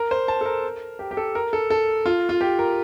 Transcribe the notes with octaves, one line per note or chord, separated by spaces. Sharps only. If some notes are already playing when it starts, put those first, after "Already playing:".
Already playing: A#4
C5
A5
A4
A#4
G4
G4
A4
A#4
A4
A4
F4
F4
G4
A#4